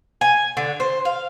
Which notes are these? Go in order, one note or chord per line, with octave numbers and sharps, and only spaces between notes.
G#5
D3
C5
F5